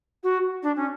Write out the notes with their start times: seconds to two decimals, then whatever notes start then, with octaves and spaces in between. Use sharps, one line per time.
0.23 F#4
0.62 D4
0.76 C#4